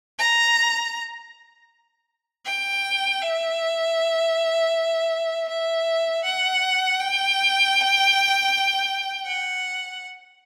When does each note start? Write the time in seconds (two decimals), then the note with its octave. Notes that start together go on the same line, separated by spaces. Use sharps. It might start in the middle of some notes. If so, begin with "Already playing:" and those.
0.19 A#5
2.45 G5
3.21 E5
5.48 E5
6.24 F#5
7.00 G5
9.26 F#5